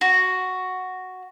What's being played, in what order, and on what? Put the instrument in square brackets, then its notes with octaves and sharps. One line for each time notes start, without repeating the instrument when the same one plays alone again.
[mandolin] F#4